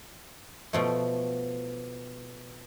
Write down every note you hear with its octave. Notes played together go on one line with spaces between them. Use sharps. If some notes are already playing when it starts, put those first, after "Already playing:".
B2 F3 A3